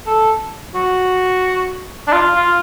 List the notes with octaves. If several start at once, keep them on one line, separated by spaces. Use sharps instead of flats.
A4
F#4
D4
F4
F4